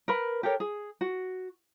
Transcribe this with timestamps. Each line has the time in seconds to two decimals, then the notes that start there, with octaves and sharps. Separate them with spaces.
0.08 A#4 B4 B5
0.43 G4 A4 A#4 C#5
0.60 G#4
1.01 F#4